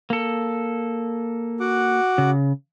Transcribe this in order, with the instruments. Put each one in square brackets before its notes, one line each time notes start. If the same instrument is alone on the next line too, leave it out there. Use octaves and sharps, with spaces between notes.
[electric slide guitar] A#3 A4
[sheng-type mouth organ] F#4 F#5 D6
[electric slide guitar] C#3